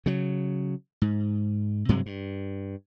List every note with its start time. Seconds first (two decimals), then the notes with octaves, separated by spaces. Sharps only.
0.06 C#3 F#3
1.02 G#2
1.89 G2 C3 F#3 G#3
2.06 G2